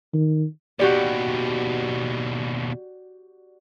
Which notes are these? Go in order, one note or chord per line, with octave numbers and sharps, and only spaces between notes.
D#3
D#2 B2 F#4 G4 D5